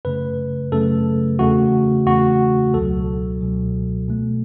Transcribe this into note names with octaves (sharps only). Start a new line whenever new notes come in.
F#2 C#3 A3 B4
F#2 C#3 A3 A4
E2 C#3 A3 F#4
E2 C#3 A3 F#4
C#2 B2 F#3 A4
C#2 B2 F#3
B2 A3